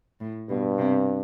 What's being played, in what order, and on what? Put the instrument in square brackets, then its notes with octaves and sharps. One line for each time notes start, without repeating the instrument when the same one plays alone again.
[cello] A2
[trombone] G2 [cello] B2
[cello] C3